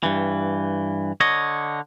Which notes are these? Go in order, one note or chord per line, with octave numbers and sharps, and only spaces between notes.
G2 E3
D3 C#5 D#5